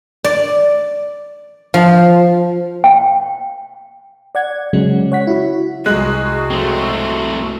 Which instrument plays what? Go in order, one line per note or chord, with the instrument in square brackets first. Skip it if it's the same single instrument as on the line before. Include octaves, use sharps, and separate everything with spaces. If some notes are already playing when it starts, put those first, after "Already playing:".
[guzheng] D5
F3
[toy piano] G5
[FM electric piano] D5 F#5 G#6
C#3 F#3 G#3 C#4
C#5 F#5 B6
E4 F#4
[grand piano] C2 F#6 [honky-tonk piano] G#3 [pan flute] F#4
[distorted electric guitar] A3 C4